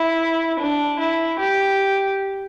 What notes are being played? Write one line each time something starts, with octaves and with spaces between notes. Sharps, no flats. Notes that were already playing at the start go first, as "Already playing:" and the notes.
Already playing: E4
D4
E4
G4